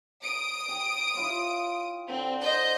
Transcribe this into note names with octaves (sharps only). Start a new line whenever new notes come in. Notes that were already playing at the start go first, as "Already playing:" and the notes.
D#6 D7
G5 G#5
E4 F4 C#5
D3 C4
C5 D#5 G6